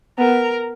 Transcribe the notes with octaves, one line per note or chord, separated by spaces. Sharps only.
B3 A#4